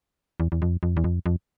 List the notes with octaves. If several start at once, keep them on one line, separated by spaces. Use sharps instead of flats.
E2
E2
F2
F2
E2
F2
F2